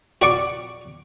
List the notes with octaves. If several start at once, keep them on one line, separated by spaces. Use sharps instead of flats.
F#4 D5 C#6 D6